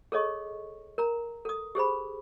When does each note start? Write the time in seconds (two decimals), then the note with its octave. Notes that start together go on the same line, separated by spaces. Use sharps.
0.12 G#4 A4 C#5 D#5 C#6
0.98 A#4 A#5
1.45 A4 D#6
1.75 G4 G#4 C5 B5